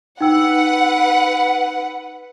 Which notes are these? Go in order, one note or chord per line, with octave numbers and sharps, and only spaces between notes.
D#4 B4 F#5 G5 E6